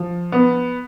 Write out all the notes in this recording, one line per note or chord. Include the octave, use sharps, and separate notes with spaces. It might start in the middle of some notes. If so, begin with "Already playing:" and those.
Already playing: F3
B3